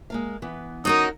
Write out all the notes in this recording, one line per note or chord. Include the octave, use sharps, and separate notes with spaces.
G#3 A#3 F5
E3 B3
C#4 D#4 F#4 A#4 D#6